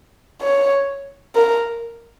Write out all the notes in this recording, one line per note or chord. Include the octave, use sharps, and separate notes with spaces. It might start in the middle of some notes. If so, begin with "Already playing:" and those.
C#5
A#4